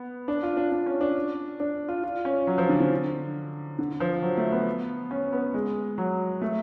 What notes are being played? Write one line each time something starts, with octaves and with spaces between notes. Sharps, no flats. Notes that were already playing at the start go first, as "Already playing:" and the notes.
Already playing: B3
D4
F4
D4
D4
C#4
D4
D4
F4
F4
C#4
F#3
F3
D3
D3
D3
F3
F#3
A3
B3
C#4
B3
G#3
F#3
A3